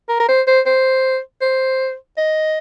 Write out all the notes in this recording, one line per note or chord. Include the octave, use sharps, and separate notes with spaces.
A#4
A#4
C5
C5
C5
C5
D#5